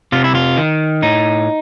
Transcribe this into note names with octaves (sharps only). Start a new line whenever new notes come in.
C3 F4
E4
F4
D#3
A2 D#4